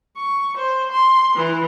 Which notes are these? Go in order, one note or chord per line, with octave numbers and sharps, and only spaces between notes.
C#6
C5
C6
E3